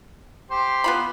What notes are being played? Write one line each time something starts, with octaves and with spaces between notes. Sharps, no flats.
G4 C5
B3 F4 B5